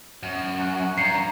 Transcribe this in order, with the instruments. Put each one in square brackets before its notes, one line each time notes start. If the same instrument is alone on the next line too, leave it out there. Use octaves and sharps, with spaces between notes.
[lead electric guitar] F#2
[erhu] F#4
[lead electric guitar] G2 [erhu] A#5 [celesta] C7 C#7